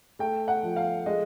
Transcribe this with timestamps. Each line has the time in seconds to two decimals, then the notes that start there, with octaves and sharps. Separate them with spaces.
0.19 A3 G5
0.48 F#5
0.63 F3
0.76 F5
1.06 G#3 D#5